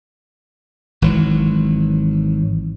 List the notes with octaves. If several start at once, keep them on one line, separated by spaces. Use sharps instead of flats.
G#1 E3 F#3